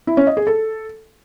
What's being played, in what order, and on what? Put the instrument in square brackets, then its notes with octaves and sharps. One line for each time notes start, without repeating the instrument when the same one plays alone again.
[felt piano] E4
C#4
D#5
G#4
A4